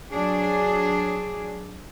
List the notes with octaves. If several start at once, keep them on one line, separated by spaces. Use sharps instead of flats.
F#3 D4 G#4